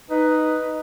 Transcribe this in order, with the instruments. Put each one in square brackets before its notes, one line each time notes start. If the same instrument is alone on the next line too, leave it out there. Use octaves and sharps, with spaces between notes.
[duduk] D#4 [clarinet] B4